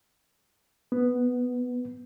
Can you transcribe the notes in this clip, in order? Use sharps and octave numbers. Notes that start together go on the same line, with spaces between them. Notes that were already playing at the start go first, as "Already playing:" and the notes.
B3